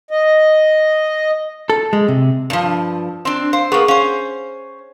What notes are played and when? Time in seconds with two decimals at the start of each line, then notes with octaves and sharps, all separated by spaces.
0.11 D#5
1.70 A4
1.93 G#3
2.08 C3
2.50 G2 F3
3.25 C4 D4
3.53 C5 F5
3.72 A#3 B3 G#4 C#6
3.88 C#4 C5 F5